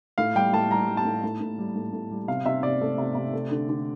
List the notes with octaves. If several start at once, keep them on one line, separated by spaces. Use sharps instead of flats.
A2 F5
G3 G5
A2 A5
G3 A#5
G3
A5
A2
A2
A2
G3
A2
A2
G3
C3 F5
C3 E5
C3 D5
A3
C3
C3
A3
D3
D3